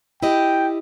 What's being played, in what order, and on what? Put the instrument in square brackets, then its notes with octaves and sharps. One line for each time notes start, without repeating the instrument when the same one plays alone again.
[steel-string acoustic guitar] E4 G4 D#5 [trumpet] G5